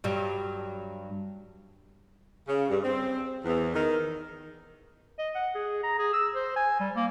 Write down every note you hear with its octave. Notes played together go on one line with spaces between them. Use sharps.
G2 F#3 G3
C#3
G2
C4
E2
D#3
D#5
F#5
G#4
A#5
G#4
E6
C5
G#5
G3
A#3